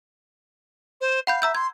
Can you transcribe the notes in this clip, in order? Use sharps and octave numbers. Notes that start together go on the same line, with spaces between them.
C5
F5 F#5 B5 G6
E5 A#5 E6 G6
C6 G#6